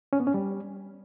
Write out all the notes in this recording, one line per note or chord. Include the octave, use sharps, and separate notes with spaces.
C#4
B3
C#4
G3